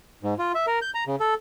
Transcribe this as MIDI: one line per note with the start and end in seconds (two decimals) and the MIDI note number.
0.23 0.34 44
0.39 0.52 65
0.55 0.66 76
0.67 0.79 70
0.82 0.90 91
0.94 1.04 82
1.07 1.16 49
1.20 1.34 69